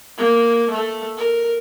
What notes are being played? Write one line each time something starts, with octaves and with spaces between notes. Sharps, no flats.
A#3
A3
A#4